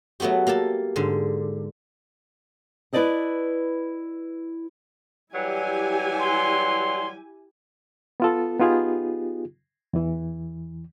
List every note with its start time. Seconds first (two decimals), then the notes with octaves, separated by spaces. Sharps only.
0.20 F#3 A3 B3 F#4 G4
0.47 A#3 G4 A4 A5
0.96 G#2 D3
2.93 E4 B4 C5 D5 D#5 A5
5.34 E3 F#3 G3 E4 G4 G#5
6.20 C6
8.20 B3 F4 A4
8.60 B3 D#4 F4 G4 G#4
9.93 E2 E3